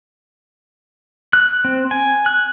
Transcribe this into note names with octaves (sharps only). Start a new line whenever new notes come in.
F#6
C4
G#5
F#6